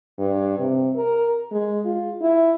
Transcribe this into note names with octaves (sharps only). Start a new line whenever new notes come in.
G2
C3
A#4
G#3
F4
E4